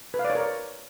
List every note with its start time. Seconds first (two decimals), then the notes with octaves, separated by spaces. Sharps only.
0.14 B4
0.19 F5
0.25 D5
0.30 C#5
0.35 A#4